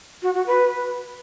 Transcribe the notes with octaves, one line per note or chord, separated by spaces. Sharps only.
F#4
F#4
B4